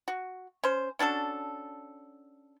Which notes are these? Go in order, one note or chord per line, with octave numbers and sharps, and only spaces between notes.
F#4
C#4 C5
C#4 D4 F#4 A4